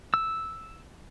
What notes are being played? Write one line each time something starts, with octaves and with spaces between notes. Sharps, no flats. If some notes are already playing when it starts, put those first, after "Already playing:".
E6